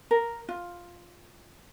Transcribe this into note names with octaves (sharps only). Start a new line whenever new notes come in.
A#4
F4